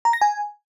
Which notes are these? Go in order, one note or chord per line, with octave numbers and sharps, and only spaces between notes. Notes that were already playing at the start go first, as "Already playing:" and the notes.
A#5
A#6
G#5